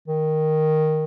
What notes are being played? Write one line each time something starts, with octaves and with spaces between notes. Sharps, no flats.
D#3